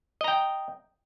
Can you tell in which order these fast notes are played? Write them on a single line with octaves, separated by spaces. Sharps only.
D#5 A#5 G5